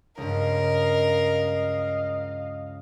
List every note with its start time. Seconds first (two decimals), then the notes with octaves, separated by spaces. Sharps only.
0.18 C#2 G2 A#4 D#5 F5